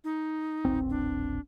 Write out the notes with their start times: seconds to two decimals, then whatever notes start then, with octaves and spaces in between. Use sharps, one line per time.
0.04 D#4
0.65 D#1 A1 C4
0.90 D4